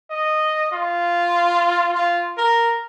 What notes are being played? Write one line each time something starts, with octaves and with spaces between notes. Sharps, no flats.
D#5
F4
F4
A#4